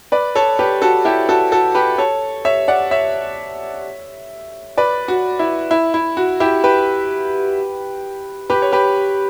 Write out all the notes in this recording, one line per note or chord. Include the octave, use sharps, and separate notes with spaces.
B4 D5
A4 C#5
G4 B4
F#4 A4
E4 G4
F#4 A4
F#4 A4
G4 B4
A4 C#5
C#5 E5
D5 F#5
C#5 E5
B4 D5
F#4
E4
E4
E4
F#4
E4 G4
G4 B4
G4 B4
C#5
G4 B4